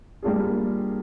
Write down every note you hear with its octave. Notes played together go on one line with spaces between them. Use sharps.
G3 A#3 D4 F4 G#4